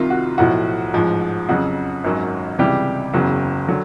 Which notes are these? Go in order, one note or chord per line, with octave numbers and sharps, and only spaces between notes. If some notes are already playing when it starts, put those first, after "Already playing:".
Already playing: C2 C3 D#3 F4
F#4
B1 A2 F3 F#4
A1 G#2 F3
F2 C#3 F#3 F#4
G#1 F#2 D#3 F#3
C#2 C3 E3 G3 G4
F#1 E2 C#3 F#3
D3 F#3